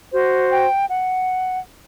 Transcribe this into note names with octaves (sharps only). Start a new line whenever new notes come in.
F#4 C5
G5
F#5